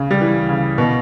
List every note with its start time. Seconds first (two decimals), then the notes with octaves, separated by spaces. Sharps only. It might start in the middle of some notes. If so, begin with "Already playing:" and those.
Already playing: C#3
0.11 G3
0.21 E3
0.49 C#3
0.78 B2